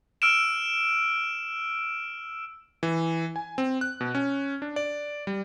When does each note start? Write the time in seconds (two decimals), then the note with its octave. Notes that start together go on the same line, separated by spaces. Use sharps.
0.22 E6 F6 D7 E7
2.83 E3
3.36 G#5
3.58 C4
3.81 F#6
4.01 B2
4.15 C#4
4.62 D4
4.76 D5
5.27 G3